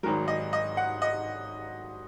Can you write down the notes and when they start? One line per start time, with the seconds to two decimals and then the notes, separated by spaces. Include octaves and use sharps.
0.03 G#1 G#2 F#3 A#4
0.28 D#5
0.53 D#5
0.77 F#5
1.02 D#5